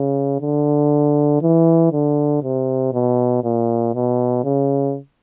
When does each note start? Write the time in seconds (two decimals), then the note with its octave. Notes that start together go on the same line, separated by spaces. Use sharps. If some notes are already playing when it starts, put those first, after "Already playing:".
Already playing: C#3
0.41 D3
1.42 E3
1.93 D3
2.43 C3
2.93 B2
3.44 A#2
3.95 B2
4.44 C#3